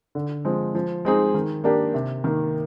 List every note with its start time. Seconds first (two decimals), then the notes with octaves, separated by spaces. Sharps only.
0.15 D3
0.45 F3 G#3 C4
0.75 F3
1.05 G#3 C4 D#4 G#4
1.35 D#3
1.64 A#3 D4 G4 A#4
1.94 C3
2.24 D#3 A#3